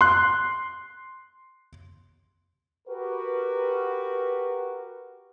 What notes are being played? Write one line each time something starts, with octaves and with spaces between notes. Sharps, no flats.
C6 F#6
F#4 G4 A#4 B4